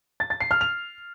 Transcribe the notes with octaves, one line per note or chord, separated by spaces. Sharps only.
A6
A6
C7
F6
F7